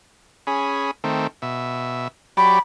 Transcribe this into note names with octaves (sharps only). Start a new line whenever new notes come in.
C#4 G#4 B5
D#3 A3 C4
B2 E5
F#3 G4 D5 B5